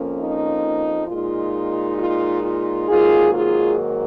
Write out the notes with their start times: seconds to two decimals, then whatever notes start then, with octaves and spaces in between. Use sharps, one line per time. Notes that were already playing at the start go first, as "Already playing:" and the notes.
Already playing: F2 F3 A#3 C#4
0.17 D#4
1.07 A#2 G#3 D#4 F4
1.98 F4
2.43 F4
2.89 G#2 D#3 F#3 A#3 F4 G#4
3.34 F4 G#4